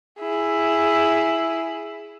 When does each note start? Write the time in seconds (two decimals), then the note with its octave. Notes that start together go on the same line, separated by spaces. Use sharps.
0.20 E4 G#4